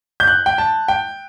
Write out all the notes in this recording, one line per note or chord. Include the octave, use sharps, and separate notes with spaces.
G6
F#6
G5
A5
G5